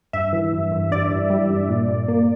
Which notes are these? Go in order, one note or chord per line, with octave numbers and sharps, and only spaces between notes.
G2 E5
E3
G2
G2
G2 D5
G2
G3
G2
A#2
A#2
A#3